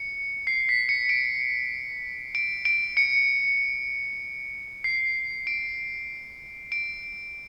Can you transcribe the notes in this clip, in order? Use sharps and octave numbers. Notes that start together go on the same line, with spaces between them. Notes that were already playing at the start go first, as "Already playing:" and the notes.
Already playing: C#7
C7
B6
C#7
D7
D7
D7
C#7
C7
D7
D7